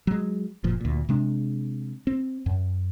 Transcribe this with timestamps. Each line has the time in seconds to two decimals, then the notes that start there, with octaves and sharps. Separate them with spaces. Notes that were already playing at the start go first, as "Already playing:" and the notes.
0.07 F#3 G#3
0.64 F#1 A#2 F3
0.81 D2 A#2
1.09 C3 G#3 D4
2.07 C4
2.46 F#2